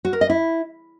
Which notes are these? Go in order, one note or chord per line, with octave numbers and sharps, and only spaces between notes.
F#4
A#4
D#5
E4